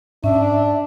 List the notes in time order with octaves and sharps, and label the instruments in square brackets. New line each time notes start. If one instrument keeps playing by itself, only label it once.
[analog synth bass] G#2 [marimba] C#4 [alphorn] D4 [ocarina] E5